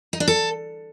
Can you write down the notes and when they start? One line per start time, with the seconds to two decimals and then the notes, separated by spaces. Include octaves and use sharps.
0.13 D#4
0.20 D4
0.27 A4